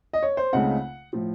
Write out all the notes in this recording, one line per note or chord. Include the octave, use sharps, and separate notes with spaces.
D#5
C#5
C5
C#2 C#3 A3 C4 D#4 F#5
A2 F3